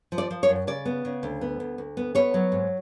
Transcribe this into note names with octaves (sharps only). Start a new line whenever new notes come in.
F3
D5
F3
C#5
F#2
C#3 D5
B3
C#3
D2
B3
D2
D2
B3
B3 C#5
F#3
G#2